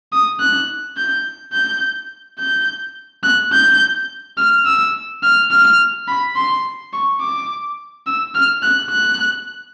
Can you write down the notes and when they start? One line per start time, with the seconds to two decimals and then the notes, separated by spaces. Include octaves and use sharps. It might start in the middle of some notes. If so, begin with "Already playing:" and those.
0.12 D#6
0.40 F#6
0.97 G6
1.53 G6
2.39 G6
3.23 F#6
3.53 G6
4.37 F6
4.66 E6
5.23 F6
5.51 F6
6.08 B5
6.36 C6
6.93 C#6
7.20 D6
8.06 E6
8.35 F6
8.63 F#6
8.90 F#6